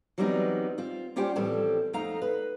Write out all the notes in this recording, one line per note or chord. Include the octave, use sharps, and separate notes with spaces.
E3 F#3 G3 B3 C4 D#4
C4 F4
G3 C#4 F4 G4 C5 G5
A2 E3 F3 G3 C4 A4
F2 A3 D#4 F5 A#5
B4